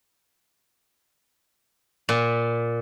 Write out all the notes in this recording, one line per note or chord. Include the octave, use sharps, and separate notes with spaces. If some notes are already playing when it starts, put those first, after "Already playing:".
A#2